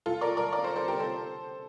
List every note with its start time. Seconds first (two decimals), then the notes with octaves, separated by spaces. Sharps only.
0.06 F4 A4
0.21 A#4 D5
0.37 A#4 D5
0.53 A#4 D5
0.64 A4 C5
0.76 A4 C5
0.88 G4 A#4
1.00 A4 C5